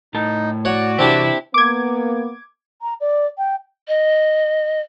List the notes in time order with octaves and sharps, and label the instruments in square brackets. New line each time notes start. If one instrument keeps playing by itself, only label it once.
[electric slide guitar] A2 A#4 A5 [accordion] D#4
[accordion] F#4 D5 [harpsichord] C#5 F#5
[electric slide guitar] C3 E3 [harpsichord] C4 D4 G4 [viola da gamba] E4
[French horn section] A#3 B3 [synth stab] D6 G#6
[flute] A#5
D5
G5
[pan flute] D#5